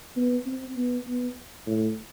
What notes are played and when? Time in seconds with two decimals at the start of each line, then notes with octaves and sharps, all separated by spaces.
0.16 B3
0.46 C4
0.76 B3
1.07 B3
1.67 A2